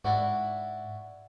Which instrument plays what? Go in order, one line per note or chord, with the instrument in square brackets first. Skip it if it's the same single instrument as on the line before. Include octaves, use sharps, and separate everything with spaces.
[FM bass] G#2 [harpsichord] D4 E4 F#4